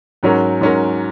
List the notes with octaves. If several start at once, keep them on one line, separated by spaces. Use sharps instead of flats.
G#2 F#3 C#4 A#4
G#2 F#3 C#4 A#4